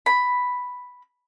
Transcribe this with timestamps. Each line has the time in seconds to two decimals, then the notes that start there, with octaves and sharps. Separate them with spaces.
0.06 B5